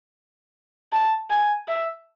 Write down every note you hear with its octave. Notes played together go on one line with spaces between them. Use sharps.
A5
G#5
E5